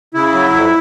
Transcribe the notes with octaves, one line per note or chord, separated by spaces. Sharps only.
C#3 E4
F#3
F2